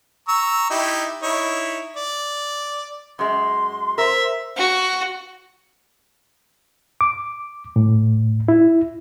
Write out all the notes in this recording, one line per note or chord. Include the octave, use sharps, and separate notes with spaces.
A#5 C#6 E6
D#4 E4 G4
D#4 E4 C#5
D5
F#2 G#3 C6
A#4 C5 E5
F#4
D6
A2
E4